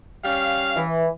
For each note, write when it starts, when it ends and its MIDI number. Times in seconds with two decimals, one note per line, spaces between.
0.25 0.84 55
0.25 0.84 61
0.25 0.84 77
0.76 1.08 52